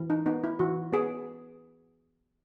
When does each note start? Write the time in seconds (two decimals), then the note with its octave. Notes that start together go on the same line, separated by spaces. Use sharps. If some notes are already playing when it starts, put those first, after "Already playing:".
Already playing: E3
0.10 D#4
0.26 B3 D#4
0.44 E4
0.59 E3 F#4
0.92 B3 G#4